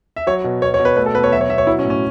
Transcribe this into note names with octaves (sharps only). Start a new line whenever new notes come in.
E5
F#3 C#5
B2
B2 C#5
C#5
B2
B4
A3 B4
A4
B2 B4
C#5
F#3 E5
C#5
B2 E5
C#5
F#3 E4
C#4
A2
C#4